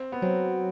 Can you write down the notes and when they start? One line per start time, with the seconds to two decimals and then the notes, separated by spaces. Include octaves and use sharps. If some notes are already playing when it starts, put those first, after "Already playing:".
Already playing: C4
0.12 B3
0.22 F#3 C4